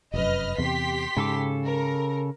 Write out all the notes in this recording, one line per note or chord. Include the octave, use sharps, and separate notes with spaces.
F1 F#2 B4 D#5 F6
E2 C3 G4 C6 B6
G#2 C#3 A4 D6
A#4